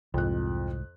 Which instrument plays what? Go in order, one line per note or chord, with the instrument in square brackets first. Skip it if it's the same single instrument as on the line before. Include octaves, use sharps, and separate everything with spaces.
[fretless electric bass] C2 G#2 [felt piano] F2 F#6